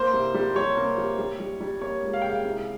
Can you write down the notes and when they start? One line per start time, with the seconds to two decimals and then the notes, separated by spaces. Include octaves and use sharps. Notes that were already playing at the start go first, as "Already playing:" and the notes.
Already playing: A#3 C5
0.13 C2
0.34 G3
0.56 G3 C#5
0.77 A#3
0.98 G3
1.19 G3
1.40 G3
1.60 G3
1.81 A#3 C#5
2.03 C#2
2.13 F5
2.22 C#3 G5
2.30 F5
2.45 C2